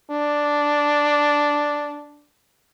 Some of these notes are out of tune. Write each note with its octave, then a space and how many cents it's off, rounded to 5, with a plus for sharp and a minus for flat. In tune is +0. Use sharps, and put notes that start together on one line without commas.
D4 -5